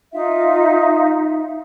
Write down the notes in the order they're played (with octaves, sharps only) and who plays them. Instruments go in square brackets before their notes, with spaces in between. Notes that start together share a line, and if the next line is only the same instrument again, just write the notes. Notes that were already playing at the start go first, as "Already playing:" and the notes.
[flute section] D#4 F4 E5 F5